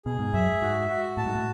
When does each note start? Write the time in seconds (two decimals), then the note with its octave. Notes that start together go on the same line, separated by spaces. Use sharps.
0.05 B2 G#4
0.19 G#2
0.33 F#2 E5
0.61 G#2 F#4
0.89 F#4
1.17 A2 A5
1.26 G#2
1.35 A2